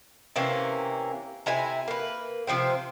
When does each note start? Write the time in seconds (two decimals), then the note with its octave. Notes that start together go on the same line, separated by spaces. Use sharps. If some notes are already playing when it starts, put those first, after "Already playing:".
0.36 C3 E3 A#3 C#4
1.46 C3 E4 G#5 A#5
1.88 A#3 B4
2.47 C3 F3 C5 G5